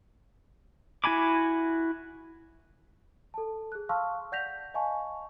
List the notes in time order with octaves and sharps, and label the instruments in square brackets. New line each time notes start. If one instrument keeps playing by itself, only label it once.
[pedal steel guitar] E4 F#4 G#5 B5 D6
[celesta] A4 A5
G#4 F#6
F5 A5 C6 C#6 E6 F6
D5 F#5 G6 A#6 B6 F7
D#5 F5 G#5 A5 C#6